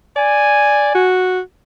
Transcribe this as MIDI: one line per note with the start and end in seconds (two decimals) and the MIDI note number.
0.17 0.92 74
0.17 1.08 80
0.95 1.40 66